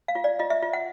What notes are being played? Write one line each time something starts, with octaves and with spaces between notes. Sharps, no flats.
F5
F4
D5
F4 D#5
E5
F4
F#5